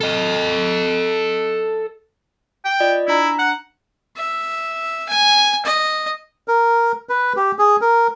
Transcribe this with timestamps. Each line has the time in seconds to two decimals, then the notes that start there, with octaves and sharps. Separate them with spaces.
0.01 A4 D#5
2.65 G5
2.80 F4 D5 D#5
3.08 D4 E4 A#5
3.39 F#5
4.17 E5
5.09 G#5
5.65 D#5
6.48 A#4
7.09 B4
7.36 G4
7.59 G#4
7.81 A#4